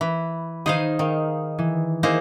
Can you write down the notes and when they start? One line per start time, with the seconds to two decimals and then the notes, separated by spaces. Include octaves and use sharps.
0.01 E3 B5
0.66 D#3 D#4 G#4 C5 D#5 F5
0.99 D#3 F5
1.58 E3
2.03 A#3 D#4 E4 G#4 C5